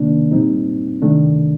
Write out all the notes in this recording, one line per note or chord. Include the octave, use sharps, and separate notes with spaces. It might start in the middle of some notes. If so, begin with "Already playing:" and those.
Already playing: C3 D#3 A#3 D4
A#2 G3 C4 D#4
C3 D#3 A3 D4